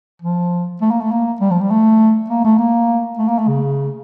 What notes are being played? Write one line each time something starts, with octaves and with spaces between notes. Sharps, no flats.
F3
A3
A#3
A3
A#3
G3
F3
G3
A3
A#3
A3
A#3
A3
A#3
A3
C#3